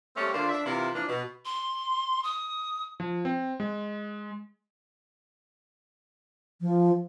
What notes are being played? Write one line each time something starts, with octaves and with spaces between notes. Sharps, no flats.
G3 A3 A#3 C4 C#4
D3 A#3 D4 F4 C5
D4 E5
C3 E3 E4 F4 A#4
E3 F3 A#3 D4
B2
C6
D#6
F3
C4
G#3
F3